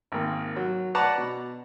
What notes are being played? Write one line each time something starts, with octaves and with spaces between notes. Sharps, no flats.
G#1 A#3
F#3
B4 D5 F#5 A5 A#5 C#6
B2